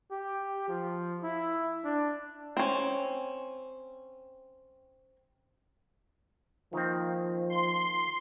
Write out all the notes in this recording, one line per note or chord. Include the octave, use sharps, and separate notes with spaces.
G4
F3
E4
D4
C4 C#4
D#3 F3 A#3 C4
C6